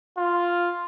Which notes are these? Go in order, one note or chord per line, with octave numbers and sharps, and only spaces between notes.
F4